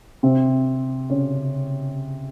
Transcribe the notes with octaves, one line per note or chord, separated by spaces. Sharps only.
C3 C4
C#3 C#4